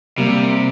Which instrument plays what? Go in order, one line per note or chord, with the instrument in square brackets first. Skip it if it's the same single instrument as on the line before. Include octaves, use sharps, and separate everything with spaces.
[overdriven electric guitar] C3 [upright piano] G3 A#3